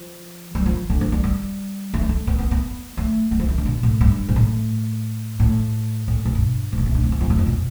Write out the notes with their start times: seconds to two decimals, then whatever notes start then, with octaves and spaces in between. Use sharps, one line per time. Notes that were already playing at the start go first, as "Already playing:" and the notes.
Already playing: F3
0.55 G3
0.66 F3
0.90 D3
1.01 F3
1.12 G3
1.24 G3
1.94 A3
2.02 G3
2.09 A3
2.27 B3
2.39 B3
2.51 B3
2.97 A3
3.31 G3
3.40 F3
3.49 E3
3.58 D3
3.66 B2
3.83 A2
4.01 G2
4.28 B2
4.36 A2
5.40 A2
6.08 A2
6.25 B2
6.35 G2
6.72 C3
6.78 B2
6.86 A3
6.94 D4
7.03 C4
7.12 E3
7.21 F2
7.30 E2
7.38 F2
7.46 B2